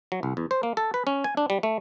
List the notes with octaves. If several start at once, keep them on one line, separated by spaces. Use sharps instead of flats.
F#3
C2
E2
C5
A#3
A4
B4
C#4
G#5
D4
G3
A3